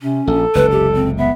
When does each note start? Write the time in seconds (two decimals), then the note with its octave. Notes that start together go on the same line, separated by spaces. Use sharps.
0.02 C3 C#4
0.27 A#1 A4
0.55 F#1 C#2 C3 B4
0.71 G4
0.94 C4
1.18 B3 E5